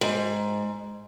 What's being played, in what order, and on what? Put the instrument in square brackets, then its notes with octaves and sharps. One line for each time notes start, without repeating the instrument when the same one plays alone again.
[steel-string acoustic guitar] G#2